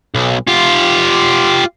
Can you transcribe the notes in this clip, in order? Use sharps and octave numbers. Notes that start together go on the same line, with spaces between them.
B1
F4 G4